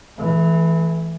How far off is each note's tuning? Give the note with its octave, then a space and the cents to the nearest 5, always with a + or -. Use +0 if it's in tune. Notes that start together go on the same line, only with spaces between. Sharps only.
E3 +0 A3 -40